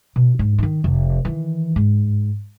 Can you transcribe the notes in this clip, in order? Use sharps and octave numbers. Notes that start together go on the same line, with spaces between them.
B2
G#2
D#3 D#4
F1
D#3 E3
G#2